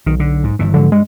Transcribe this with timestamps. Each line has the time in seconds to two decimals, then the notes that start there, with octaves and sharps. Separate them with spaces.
0.06 B1 D#3
0.20 D3
0.44 G#2
0.59 G1 G2 E3
0.74 G#2 D3 F3 F#3
0.92 G2 G#3